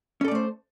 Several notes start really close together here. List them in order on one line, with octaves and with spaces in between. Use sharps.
C#4 A4 D5 A3 C5